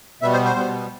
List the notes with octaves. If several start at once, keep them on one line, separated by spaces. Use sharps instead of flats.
B2 G3 B3 E5
C5
C5
B2 G3 B3